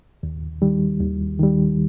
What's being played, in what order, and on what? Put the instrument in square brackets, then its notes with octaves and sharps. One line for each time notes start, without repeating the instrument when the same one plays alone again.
[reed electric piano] D#2
D#3 G3
D#2
D#3 G3